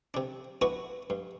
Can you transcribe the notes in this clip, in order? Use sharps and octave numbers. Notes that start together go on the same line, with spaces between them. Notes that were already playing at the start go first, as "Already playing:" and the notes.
C3 D4
B3 D4 E4 F#4 B4
G2